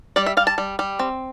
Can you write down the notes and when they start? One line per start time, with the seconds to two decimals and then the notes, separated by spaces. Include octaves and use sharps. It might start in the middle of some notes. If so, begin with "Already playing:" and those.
0.16 G3 D5
0.26 E5
0.37 G3 F5
0.47 A5
0.58 G3
0.79 G3
0.99 C4